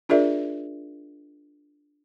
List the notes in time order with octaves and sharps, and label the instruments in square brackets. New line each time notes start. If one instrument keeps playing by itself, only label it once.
[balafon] D4 F4 G#4 A#4 D5 E5